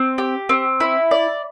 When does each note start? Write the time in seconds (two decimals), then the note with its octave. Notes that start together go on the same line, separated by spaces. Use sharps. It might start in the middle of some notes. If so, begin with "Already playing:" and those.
Already playing: C4
0.18 G4
0.49 C4
0.80 E4
1.11 D5